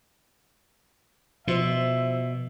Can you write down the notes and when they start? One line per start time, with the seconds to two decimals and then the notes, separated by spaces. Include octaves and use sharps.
1.47 B2 F3 C5 E5